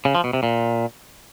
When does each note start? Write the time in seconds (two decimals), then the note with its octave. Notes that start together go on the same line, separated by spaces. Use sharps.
0.05 C#3
0.15 F3
0.24 B2
0.33 C3
0.43 A#2